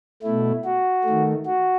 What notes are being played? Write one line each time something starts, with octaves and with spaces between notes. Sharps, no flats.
B2 A3 E4
F#4
D#3 A3
F#4